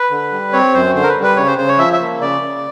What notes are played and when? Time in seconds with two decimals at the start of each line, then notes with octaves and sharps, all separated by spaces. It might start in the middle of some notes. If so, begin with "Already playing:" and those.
Already playing: B4
0.10 D3
0.32 G3
0.53 C4 C#5
0.74 F#2 C5
0.95 D3 C5
1.03 A#4
1.09 B4
1.15 G3
1.23 B4
1.37 C#3 C#5
1.47 C5
1.58 C#3 C5
1.68 C#5
1.79 F3 E5
1.93 E5
2.00 A#3
2.21 C#3 D5
2.42 C#3